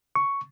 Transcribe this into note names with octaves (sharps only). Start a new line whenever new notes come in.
C#6